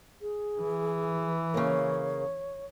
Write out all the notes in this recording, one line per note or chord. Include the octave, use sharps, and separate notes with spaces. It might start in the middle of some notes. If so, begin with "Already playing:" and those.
G#4
E3
C#3 A#3 C#5